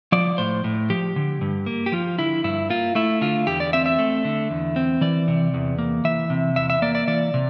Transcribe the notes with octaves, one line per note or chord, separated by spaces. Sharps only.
F3 D5
A2 C5
A2
F3 G4
D3
G2
A#3
G4
F3 F4
D3 E4
G2 E4
A#3 F4
A3 E4
D3 F4
E2 G4
D5
C4 E5
E5
A3
D3
E2
C4
E3 D5
C3
E2
A#3
E3 E5
C3
E2 E5
E5
A#3 D5
D5
E3 D5
C3